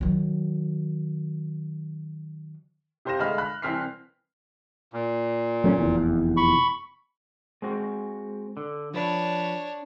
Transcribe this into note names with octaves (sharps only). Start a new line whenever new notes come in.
D#3 F#3
C3 G4 C5 F5 A#6 E7
G1 D3 G#3 F5 B5 F6
B5 F#6
C2 E3 C4 F6 B6 C7
A#2
F#3 A3 C#4
F1 E2
B5 C#6
G#3 C4 F#4
D3
F3 D4 B4 C#5